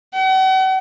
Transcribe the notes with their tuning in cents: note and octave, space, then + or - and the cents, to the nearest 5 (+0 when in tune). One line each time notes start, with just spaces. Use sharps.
F#5 +40